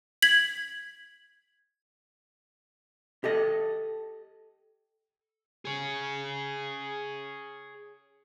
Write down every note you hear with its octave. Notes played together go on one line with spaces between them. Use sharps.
G#6 B6 F#7
G4 A4 D#5
G#4 C#5